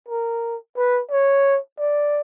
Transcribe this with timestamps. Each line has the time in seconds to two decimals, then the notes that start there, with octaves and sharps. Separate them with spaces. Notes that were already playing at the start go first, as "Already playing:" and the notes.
0.08 A#4
0.77 B4
1.11 C#5
1.79 D5